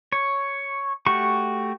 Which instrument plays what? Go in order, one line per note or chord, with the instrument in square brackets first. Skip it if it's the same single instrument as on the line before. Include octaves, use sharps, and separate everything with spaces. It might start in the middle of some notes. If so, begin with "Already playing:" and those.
[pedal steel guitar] C#5
A3 F#4 G4 C#6